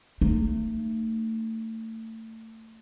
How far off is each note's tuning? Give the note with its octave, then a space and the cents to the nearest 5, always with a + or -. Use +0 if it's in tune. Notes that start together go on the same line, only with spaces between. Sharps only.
A3 +30 D#4 -35